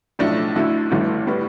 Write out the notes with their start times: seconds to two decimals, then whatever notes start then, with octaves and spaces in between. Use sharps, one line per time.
0.19 B1 A2 F3 A3 D4
0.56 D2 D3 A3 E4
0.91 G1 G2 E3 A3
1.27 A2 G3 B3